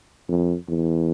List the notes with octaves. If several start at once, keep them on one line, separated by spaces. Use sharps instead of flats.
F2
E2